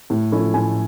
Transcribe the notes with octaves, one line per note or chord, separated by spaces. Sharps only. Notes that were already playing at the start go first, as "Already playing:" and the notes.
A2
F3 A3 C#4 E4
A2 G#5